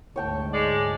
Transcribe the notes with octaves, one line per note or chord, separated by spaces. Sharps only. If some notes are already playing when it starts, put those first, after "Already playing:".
D2 G#2 C#5 G5 A5
G#3 D5